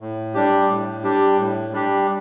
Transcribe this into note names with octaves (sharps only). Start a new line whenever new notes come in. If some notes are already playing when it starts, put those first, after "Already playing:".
A2
G3 D4 G4
A2
G3 D4 G4
A2
G3 D4 G4